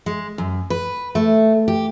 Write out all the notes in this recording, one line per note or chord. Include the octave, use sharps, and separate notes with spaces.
G#3
F#2
B4
A3
G4